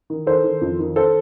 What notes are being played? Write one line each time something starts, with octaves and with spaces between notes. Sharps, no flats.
D#3
D#3 A4 C5
D#3
F2
D#3
A4 C5